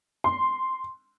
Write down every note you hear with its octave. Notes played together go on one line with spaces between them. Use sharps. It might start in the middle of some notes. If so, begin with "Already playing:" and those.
C6